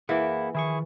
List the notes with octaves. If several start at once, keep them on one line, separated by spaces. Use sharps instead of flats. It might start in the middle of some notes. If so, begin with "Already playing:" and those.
E3 A#3 E4 G#4 F#5
D#3 F3 E4 G#4 C#6